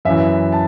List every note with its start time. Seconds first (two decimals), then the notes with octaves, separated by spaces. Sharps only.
0.05 F#2 E3 E5
0.52 A5